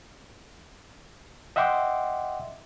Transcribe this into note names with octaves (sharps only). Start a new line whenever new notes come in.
D#5 E5 F#5 G5 C6 D6